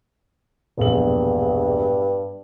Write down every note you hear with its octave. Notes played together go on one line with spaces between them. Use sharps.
E1 A#1 G2 F#7